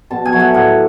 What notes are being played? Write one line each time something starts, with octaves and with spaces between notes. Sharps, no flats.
B2 A5
G#5
F#3 A3
F#5
A2 F#5